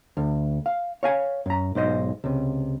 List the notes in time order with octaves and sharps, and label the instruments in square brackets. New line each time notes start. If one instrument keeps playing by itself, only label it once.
[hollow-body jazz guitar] D2
F5
C#5 F5 G#5
F#2 A#5
B1 G#2 C5 D#5
C#2 C3